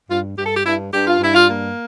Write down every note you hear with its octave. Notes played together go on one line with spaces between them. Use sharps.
G2 F4
G2 G4
A4
G4
G2 E4
G2 G4
F4
G2 E4
F4
A#3